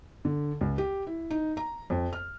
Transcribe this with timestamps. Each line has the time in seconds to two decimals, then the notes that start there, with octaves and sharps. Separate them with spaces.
0.25 D3
0.61 C#2
0.78 G4
1.07 E4
1.30 D#4
1.57 A#5
1.90 F2
2.13 F6